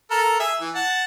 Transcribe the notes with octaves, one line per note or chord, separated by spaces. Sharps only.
A4 A#4
G#4 E5
E3
F#5 A5